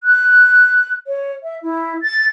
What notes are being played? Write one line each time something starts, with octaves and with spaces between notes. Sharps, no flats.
F#6
C#5
E5
E4
A6